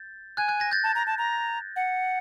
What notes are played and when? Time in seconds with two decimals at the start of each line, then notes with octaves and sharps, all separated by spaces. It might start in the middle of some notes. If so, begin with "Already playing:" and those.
Already playing: G6 A6
0.37 G#5 F#6 G#6
0.48 F#6 G#6
0.60 G#6 A#6
0.71 G6 A6
0.84 A5
0.95 A#5
1.07 A5
1.18 A#5
1.76 F#5